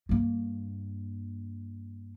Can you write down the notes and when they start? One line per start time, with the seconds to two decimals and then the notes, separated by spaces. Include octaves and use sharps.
0.09 G2 A#3